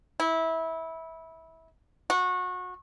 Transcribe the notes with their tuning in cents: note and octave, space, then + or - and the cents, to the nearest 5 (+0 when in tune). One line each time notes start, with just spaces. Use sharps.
E4 -20
F#4 -25